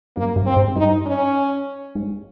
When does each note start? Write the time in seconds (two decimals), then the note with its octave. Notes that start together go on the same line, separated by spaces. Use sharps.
0.16 G2 A#3
0.36 G2
0.46 C4
0.56 G#2
0.76 G2 D#4
1.06 C#4
1.95 G#2